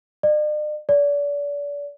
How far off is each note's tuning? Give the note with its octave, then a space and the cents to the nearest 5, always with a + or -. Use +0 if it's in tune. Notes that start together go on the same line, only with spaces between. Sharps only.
D5 +45
D5 -35